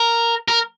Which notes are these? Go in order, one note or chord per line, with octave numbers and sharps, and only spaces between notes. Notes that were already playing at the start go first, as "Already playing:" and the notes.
Already playing: A#4
A#4